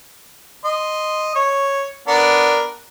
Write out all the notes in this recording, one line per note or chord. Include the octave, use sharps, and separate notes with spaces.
D#5 C6
C#5
B3 D4 A#4